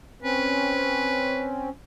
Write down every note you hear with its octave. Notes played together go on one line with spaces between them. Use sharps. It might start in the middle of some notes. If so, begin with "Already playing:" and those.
C4 C#4 B4